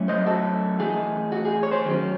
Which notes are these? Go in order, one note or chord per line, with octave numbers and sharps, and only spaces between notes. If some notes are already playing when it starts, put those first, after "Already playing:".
Already playing: F#3 A3 C#4 E4
C5 D#5
F#4 A4
E3 A3 D#4 G#4
F#4
G#4
C#5
G#4 C5
D#3 F#3 C#4